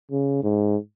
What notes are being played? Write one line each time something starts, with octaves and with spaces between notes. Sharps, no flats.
C#3
G#2